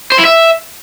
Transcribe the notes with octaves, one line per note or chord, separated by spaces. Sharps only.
C5
E4
E5